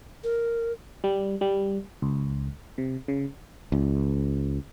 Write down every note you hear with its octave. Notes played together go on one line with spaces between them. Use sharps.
A#4
G3
G3
C#2
C3
C#3
C#2